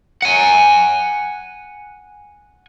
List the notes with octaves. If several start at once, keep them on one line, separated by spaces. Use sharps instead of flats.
F#5 G#5